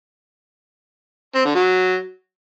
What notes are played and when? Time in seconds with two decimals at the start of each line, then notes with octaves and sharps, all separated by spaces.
1.35 C4
1.45 D3
1.55 F#3